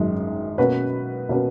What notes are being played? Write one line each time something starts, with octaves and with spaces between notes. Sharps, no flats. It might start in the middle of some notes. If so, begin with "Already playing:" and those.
Already playing: G#1 F#2 D#3 G#3
B2 A#3 C#4 F#4 B4
B2 A#3 C#4 F#4 B4